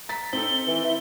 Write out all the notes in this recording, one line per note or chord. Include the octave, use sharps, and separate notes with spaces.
A#5 A6 B6
C4 D#4 A4 G7
E3
E4